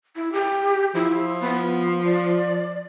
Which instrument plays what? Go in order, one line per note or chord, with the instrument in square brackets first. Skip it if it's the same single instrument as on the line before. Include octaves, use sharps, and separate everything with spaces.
[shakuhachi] E4
G4
[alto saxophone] F3 [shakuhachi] E4
[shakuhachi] B3
D5